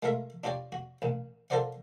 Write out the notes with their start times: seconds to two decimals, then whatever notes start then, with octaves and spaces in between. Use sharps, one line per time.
0.03 G#3 A3 F4 A#4 E5
0.44 D4 F4 G4 C#5 D5
0.72 F#4
1.02 A1 A#2
1.50 F4 A4 A#4 C5 D5 F#5